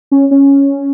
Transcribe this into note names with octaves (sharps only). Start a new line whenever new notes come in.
C#4
C#4